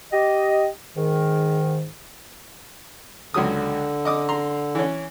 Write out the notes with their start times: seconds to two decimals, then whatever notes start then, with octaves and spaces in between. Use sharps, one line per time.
0.12 G4 D#5
0.96 G#2 D#3
3.34 C#2 D3 F#3 D#6
4.05 D#5 D6 D#6
4.29 A#5 C6
4.75 E3 C#4